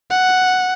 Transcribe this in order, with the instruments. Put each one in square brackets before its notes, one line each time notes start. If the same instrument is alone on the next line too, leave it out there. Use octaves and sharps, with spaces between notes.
[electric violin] F#5